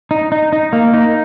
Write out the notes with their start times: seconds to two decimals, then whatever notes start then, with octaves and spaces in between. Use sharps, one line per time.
0.11 D#4
0.32 D#4
0.53 D#4
0.73 A#3
0.94 D#4